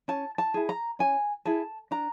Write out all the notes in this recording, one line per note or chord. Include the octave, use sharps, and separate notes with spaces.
C#4 A5
A5
E4 G#4
A#5
C#4 G#5
E4 G#4 A5
D4 A#5